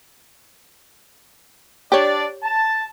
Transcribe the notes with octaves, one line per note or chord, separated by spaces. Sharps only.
D4 G4 C#5 D5
A5